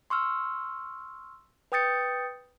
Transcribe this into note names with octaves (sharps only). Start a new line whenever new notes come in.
C6 C#6 E6 F6
B4 G5 D#6 G6 A6 C#7